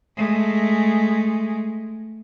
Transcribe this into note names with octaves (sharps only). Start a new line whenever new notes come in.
G#3 A3